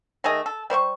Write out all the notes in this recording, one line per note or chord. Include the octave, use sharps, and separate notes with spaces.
D#3 A3 G#4 D#5
A4
G3 C5 C6 C#6